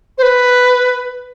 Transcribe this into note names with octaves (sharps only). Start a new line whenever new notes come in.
C5
B4